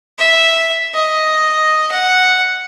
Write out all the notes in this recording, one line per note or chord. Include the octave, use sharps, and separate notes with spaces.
E5
D#5
F#5